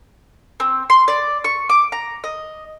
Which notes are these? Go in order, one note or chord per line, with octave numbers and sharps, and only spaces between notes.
C4
C6
D5
C#6
D6
A#5
D#5